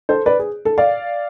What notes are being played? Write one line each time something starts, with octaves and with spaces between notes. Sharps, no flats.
A4 C5
B4 D5
G#4
A4
D5 F5